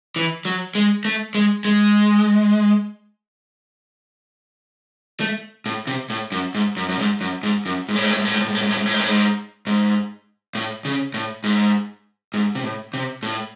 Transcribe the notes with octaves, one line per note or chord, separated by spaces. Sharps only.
E3
F#3
G#3
A3
G#3
G#3
A3
A2
C3
A2
F#2
G#2
F#2
F#2
G#2
F#2
G#2
F#2
G#2
A2
G#2
A2
G#2
A2
G#2
A2
G#2
A2
G#2
A2
G#2
A2
G#2
A2
G#2
G#2
A2
C#3
A2
G#2
G#2
C3
A2
C3
A2